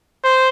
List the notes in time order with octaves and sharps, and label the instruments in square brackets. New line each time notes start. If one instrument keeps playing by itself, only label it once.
[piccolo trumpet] C5